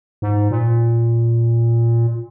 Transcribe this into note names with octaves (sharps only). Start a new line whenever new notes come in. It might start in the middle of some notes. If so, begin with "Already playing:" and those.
G#2
A#2